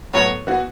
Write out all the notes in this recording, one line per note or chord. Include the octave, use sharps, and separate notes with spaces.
A2 F#3 B3 C#5
E3 B3 F#4